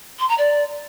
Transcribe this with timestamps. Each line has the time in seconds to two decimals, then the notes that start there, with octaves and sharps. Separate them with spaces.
0.19 C6
0.28 A#5
0.38 D5